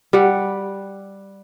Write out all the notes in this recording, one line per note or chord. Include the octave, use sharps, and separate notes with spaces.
G3 F#5